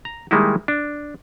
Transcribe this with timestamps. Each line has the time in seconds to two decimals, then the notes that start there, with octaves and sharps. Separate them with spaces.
0.05 A#5
0.31 D#3 G3 G#3 A#3 D#4 E4
0.68 D4